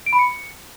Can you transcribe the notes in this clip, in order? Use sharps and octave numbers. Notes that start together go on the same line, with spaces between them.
D7
B5
C#7